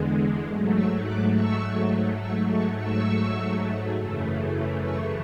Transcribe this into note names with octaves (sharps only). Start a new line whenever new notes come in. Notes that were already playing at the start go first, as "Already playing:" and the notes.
Already playing: E2 D3 G#3
G#2 F#3 A3
C#6 E6
D6 F#6
C#6 E6
G#2 F#3 A3 C#6 E6
A5 C#6
C#6 E6
F#2 C#3 E3 A3
C#6 E6